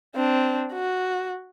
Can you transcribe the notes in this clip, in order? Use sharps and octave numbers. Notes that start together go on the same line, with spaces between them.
C4 D4
F#4